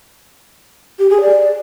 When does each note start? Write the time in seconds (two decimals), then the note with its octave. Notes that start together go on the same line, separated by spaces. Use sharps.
0.99 G4
1.10 G#4
1.21 D5